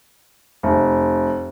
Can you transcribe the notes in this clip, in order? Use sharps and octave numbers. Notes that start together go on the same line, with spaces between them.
F1